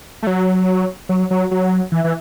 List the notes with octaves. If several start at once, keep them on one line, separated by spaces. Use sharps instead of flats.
A3
F#3
F#3
F#3
F#3
E3
E3